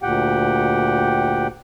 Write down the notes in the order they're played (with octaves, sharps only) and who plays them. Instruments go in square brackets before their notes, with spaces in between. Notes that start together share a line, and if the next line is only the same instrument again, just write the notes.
[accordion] D2 A#2 G4 F#5 G5